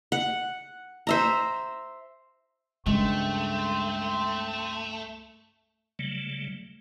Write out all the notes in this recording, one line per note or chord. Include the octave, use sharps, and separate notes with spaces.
F#5
C5 E5 A#5
C#2 G2 C#3 G#3 A3 C4 C6
C#3 F#3 G3 A3